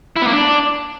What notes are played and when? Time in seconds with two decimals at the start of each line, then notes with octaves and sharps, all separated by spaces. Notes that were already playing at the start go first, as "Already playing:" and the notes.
0.16 E4
0.22 B3
0.27 A#3
0.33 D4